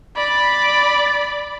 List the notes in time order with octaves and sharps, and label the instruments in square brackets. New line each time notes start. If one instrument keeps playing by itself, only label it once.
[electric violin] D5 B5